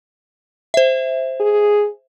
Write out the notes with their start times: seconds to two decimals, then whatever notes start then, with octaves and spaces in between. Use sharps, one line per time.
0.74 C5 E5
1.40 G#4